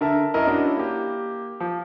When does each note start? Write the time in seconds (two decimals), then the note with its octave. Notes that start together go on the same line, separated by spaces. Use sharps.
0.01 D3 A#4 E5 A5
0.34 F#2 E4 A#4 D#5
0.47 C#4 D4 E4 F#4 D#5
0.77 A#3 G4
1.60 F3